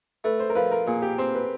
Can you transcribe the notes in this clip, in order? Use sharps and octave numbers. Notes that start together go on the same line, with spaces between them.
A3 B4
C5
A#4
F3 B4
A#4
A#2 G#4
G4
C4 C5
B4